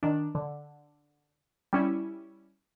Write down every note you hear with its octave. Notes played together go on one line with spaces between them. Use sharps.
D#3 D4
D3
G3 C#4 E4